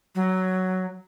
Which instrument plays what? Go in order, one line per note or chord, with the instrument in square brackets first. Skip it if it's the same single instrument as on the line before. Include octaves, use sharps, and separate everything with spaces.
[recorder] F#3